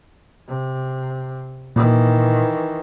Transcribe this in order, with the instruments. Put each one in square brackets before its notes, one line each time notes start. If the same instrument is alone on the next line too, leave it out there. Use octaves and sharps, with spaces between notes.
[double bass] C3
[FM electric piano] A#2 [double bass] D#3 E3